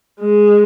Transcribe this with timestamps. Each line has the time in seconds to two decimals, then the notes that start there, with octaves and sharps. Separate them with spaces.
0.20 G#3